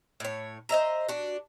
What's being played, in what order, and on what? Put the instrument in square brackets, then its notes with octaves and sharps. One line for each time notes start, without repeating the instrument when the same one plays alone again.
[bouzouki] A2 C#5
C5 D#5 E5 A#5
D4 F#4